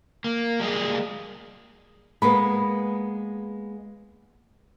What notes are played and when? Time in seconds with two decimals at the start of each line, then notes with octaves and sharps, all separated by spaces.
0.24 A#3
0.60 G3 G#3 A#3 G#4
2.22 G#3 A#3 B3 B4 B5